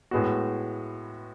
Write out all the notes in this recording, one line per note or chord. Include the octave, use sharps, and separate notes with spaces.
A2 G#3 B3 F#4